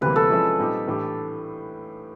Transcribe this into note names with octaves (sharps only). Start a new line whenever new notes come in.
D2 C3 E3 G3 A#3 B4
A4
F3 G#3 C#4 E4
A#2 G3 C4 D#4 G4
A2 E3 A3 D4 G4